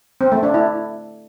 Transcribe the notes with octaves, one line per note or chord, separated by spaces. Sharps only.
C4
A3
D4
E4